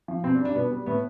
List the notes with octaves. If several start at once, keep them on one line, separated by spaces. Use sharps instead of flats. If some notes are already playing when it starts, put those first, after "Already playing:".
F3
B2 C4
D4
G3
D4
B2 B3
G3
A2 B3